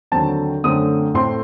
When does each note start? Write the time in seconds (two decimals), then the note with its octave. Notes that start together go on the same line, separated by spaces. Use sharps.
0.12 D#2 D3 F#3 C4 A5
0.64 F#2 D3 A3 C4 D#6
1.14 A2 A3 C4 C6